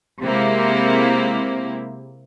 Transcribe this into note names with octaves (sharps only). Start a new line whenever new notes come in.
C3 G#3 A#3 C4 E4